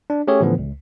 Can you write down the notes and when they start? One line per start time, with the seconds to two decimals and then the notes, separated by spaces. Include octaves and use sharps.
0.10 D4
0.27 A3 C#4 G4 G#4 C#5
0.41 A2 D3 E3 F3 B3
0.58 C#2